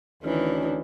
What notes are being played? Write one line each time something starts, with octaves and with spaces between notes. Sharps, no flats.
D2 D#3 E3 C#4 D4